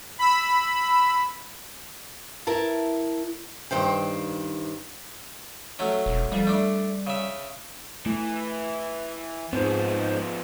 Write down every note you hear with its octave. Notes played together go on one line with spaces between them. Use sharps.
B5 E6
E4 A#4 A5
G2 D#3 C5 G5
F#3 A3 C#4
E1
F2 G3
A3 D4
C#3 E5
E3 A3
G#2 F3 B3 C4 C5